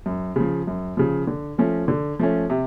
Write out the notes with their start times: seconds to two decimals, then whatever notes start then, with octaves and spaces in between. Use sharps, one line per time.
0.06 F#2
0.36 C#3 F3
0.67 F#2
0.97 C#3 F3
1.27 D3
1.58 F3 A3 C#4
1.88 D3
2.19 F3 A3 C#4
2.50 C3